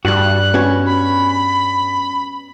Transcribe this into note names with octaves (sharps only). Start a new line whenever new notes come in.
G2 G3 F#4 F#6
B3 C#4 F#4
B5